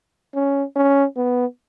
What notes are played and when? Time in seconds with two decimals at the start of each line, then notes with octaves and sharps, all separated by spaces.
0.35 C#4
0.76 C#4
1.17 B3